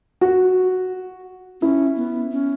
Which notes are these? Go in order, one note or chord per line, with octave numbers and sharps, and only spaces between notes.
F#4
C#4 E4
B3
C#4